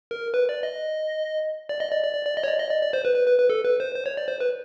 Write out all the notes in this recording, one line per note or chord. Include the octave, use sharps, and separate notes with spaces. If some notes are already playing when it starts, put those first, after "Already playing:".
A#4
B4
D5
D#5
D5
D#5
D5
D5
D5
D5
D#5
C#5
D5
D#5
D5
D5
C5
B4
B4
B4
B4
A4
B4
C5
C5
C#5
D5
C5
B4